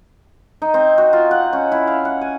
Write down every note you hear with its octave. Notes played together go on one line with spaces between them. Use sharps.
D#4
C4
F#4
F4
F#5
C#4
E4
F5
F#5
G#5